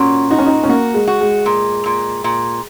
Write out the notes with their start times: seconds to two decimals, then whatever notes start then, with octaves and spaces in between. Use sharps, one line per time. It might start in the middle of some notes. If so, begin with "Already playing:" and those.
Already playing: A#2 C#4 F#4
0.30 D#4 F#4
0.39 C#4
0.46 D#4
0.63 C#4
0.68 A#3 F#4
0.94 G#3
1.07 F#4
1.21 G#3
1.46 A#2
1.86 A#2
2.24 A#2